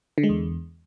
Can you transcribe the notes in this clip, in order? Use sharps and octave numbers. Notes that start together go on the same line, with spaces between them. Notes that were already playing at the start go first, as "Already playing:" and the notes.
D3
G#3
E2